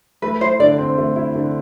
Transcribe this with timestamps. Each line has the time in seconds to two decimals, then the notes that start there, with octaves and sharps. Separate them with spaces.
0.22 A3 B4
0.41 E4 C5
0.60 D3 D5
0.78 C4
0.98 A3
1.16 E4
1.36 D3